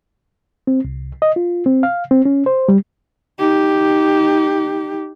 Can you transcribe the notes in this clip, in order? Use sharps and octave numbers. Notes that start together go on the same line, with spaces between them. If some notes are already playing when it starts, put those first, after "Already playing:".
C4
C2
D#5
F4
C4
F5
C4
C#4
C5
G3
D#4 G4